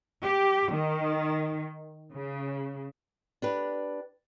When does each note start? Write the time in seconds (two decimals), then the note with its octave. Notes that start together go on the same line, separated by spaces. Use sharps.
0.22 G4
0.72 D#3
2.14 C#3
3.42 D4 G4 B4